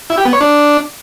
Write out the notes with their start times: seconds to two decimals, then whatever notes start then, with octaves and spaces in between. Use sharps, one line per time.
0.10 E4
0.18 G4
0.25 B3
0.33 C#5
0.41 D4